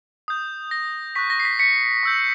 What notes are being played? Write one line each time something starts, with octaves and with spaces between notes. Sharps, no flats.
D#6 G6
A#6
C#6 F#6 B6
A#6
C7
B6
B6 C#7
C#6 E6 G6